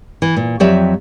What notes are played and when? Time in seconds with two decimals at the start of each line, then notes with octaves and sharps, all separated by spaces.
0.22 E3
0.37 A#2
0.60 F2 F#3 G4 D5 E5